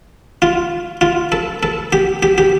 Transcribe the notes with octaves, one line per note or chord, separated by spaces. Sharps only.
F4
F4
A4
A4
G4
G4
G4